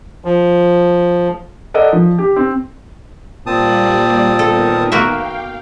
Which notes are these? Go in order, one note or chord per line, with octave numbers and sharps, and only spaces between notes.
F3
A4 A#4 D5 D#5 F#5
F3
G4
C4
A#2 G3 A#3 C4 D5 A5 D#6
D#3 B3 A4 A#4
A#3 F#4 E5 F5 G5